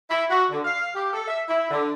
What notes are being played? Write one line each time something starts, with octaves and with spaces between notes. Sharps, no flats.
E4
F#4
D3
F5
G4
A4
E5
E4
D3